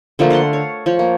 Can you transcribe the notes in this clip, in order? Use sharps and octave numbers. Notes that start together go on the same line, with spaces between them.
D3 F3 A3 A#3
F5 F#5 A5 C6
C#5
F3 C#5
A#3